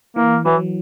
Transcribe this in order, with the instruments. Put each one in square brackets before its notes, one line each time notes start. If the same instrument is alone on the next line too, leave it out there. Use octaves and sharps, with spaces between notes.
[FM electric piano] E3 [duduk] A#3
[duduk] E3 [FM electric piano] F#3